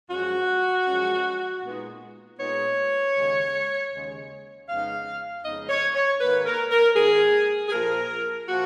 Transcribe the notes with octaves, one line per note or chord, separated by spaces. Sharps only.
F#2 F3 G#3 C#4 F#4
F#2 F3 G#3 C#4
A#2 G#3 B3 D#4
A#2 G#3 B3 D#4 C#5
D#2 C#3 G#3
D#2 C#3 G#3
F2 C#3 G#3 B3 D#4 F5
F2 C#3 G#3 B3 D#4 D#5
C#5
C#5
G#2 D#3 A#3 B4
A#4
A#4
G#2 D#3 A#3 G#4
G#4
A#2 F3 A#3 A#4
A#2 F3 A#3 F#4